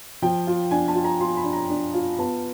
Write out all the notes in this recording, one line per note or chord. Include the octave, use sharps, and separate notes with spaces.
F3 G5
F4
D4 G#5
A5
F4
A#5
F4 C6
B5
D4
A#5
D4
F4
B3 A5